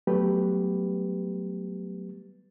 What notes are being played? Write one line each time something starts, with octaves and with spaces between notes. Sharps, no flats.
F#3 G3 A3 B3 G4 B4